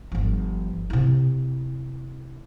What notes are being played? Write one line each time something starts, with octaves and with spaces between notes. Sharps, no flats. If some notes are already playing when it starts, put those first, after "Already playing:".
G1 F3
C3 E4